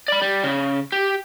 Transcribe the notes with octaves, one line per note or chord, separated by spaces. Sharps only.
D5 B5
G3
C#3
G4